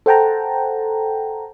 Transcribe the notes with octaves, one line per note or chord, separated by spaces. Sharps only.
A4 C5 F#5 G5 A5 A#5